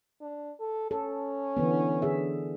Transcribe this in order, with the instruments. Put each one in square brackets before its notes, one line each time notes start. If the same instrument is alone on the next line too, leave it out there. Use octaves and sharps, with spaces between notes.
[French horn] D4
A4
[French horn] C#4 [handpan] A4
[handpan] D3 E3 B3
D3 G#4 E5